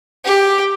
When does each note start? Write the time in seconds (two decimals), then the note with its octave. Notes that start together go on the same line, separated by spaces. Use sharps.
0.25 G4